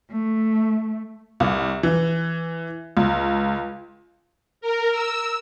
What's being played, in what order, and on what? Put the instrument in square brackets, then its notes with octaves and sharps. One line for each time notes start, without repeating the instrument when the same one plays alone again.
[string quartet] A3
[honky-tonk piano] C2
E3
C#2
[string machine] A#4
E6